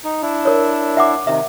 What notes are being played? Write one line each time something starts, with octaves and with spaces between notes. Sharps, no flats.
D#4
D4 E4
A#4 C#5
E5 F#5 D6
C3 D#3 E5